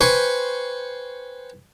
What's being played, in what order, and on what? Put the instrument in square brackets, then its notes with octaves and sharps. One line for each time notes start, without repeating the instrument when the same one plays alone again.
[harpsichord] B4 C5 G5 G#5 C6 C#6